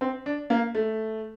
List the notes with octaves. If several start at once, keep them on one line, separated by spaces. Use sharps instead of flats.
C4
D4
A#3
A3